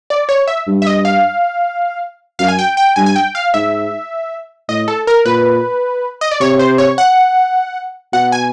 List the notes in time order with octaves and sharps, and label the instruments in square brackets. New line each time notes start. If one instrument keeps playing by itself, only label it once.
[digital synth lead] D5
C#5
E5
[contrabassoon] G2
[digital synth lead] E5
D#5
F5
[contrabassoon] F#2 [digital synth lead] F5
[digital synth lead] G#5
G5
G5
[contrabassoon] G2 [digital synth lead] G#5
[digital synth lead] G#5
G5
F5
[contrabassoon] G#2 [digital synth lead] E5
[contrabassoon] A2 [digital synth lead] D#5
[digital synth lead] A4
A#4
[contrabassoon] A#2 [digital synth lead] B4
[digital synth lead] D#5
D5
[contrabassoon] C3 [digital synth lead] C#5
[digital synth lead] C5
C#5
F#5
[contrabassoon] B2 [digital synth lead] F#5
[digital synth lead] G#5